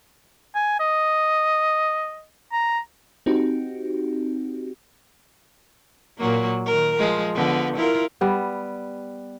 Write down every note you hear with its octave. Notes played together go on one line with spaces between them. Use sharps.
G#5
D#5
A#5
C4 D#4 F#4 G4
A#2 F#3 A#3
D#3 A#4
F3 G#3
D3 F3 B3
E4 F4 A#4
G3 B3